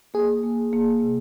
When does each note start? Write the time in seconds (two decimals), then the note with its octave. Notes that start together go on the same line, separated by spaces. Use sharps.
0.14 A#3 G#4
0.44 A#3
0.73 A#3
1.02 C3